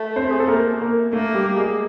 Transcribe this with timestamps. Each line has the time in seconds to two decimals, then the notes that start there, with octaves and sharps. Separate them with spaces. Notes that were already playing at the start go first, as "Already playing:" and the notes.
Already playing: A3
0.16 C4 C5
0.31 G#4
0.40 A4
0.48 A#3 A#4
0.81 A#3 A#4
1.13 A3 A#3 A4
1.34 G3 G4
1.56 G#3 G#4